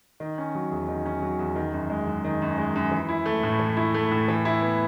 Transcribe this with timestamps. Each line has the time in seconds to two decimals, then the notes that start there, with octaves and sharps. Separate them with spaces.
0.20 D#3
0.38 C#4
0.55 F#3
0.71 E2
0.89 D#3
1.06 C#4
1.22 F#3
1.39 E2
1.56 D#3
1.73 F#2
1.90 G#3
2.07 F#2
2.24 D#3
2.42 F#2
2.58 G#3
2.75 F#2
2.92 E3
3.09 E4
3.25 A3
3.43 A2
3.59 E3
3.77 E4
3.94 A3
4.11 A2
4.28 E3
4.45 E4
4.61 B3